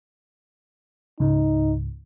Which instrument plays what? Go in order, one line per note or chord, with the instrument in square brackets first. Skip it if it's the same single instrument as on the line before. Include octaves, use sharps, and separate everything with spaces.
[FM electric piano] C#2 G#2 [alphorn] D#4